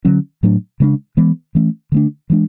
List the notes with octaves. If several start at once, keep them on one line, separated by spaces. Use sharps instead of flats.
D3 F#3 C#4
A2 F#3 A3 D4
C#3 G#3 B3 D4
E3 G#3 B3
E3 A3 C#4
D3 A3 D4
E3 G#3 D4